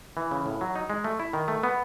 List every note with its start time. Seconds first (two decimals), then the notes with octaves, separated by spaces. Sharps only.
0.17 E3
0.31 C#3
0.46 A2
0.61 F#3
0.75 D#4
0.90 G#3
1.04 A3
1.20 E4
1.33 D#3
1.48 A3
1.63 B3